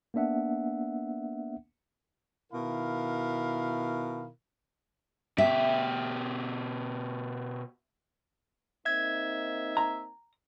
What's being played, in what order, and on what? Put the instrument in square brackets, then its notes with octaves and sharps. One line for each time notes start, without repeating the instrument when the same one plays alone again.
[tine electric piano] A#3 B3 D4 E5 F#5
[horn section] B2 D#3 E4 A#4 F5 B5
[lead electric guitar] B2 G4 [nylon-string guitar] E5
[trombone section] A#3 C4 D#4 [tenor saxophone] E5 [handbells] G#6
[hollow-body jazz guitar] A#5